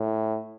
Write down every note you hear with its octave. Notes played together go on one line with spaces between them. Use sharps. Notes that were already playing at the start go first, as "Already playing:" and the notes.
Already playing: A2